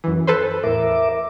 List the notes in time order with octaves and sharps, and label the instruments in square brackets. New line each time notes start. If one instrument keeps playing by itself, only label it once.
[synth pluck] F#2 E3
A4 B4 C5
[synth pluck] E2 A2 [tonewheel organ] A#4 E5 D6